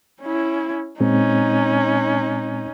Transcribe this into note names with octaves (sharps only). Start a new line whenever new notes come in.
C#4 E4
A#2 G#3 C4 C#4 D#4